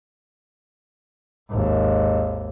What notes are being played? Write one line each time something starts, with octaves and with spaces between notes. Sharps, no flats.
G#1 D#2